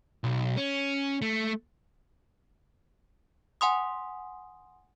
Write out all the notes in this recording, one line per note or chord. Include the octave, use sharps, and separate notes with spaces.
B1
C#4
A3
F#5 G#5 C6 D#6